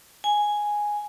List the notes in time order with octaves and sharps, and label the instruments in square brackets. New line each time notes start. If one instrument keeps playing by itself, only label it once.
[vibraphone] G#5